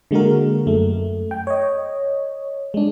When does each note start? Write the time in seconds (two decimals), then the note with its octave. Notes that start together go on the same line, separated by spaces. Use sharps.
0.11 D3 G#3 A#3 F#4 A#4
0.67 F#2 A3
1.31 G5
1.47 C#5 D#5
2.74 G#3 D4